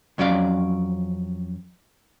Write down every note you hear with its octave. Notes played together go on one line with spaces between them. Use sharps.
F2 F#3 C#4 D5 F5